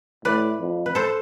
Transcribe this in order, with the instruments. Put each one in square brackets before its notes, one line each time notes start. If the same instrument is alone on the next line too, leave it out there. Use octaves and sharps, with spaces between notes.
[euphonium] A2 [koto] B4 D5
[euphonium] F2
[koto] B4
A4 C5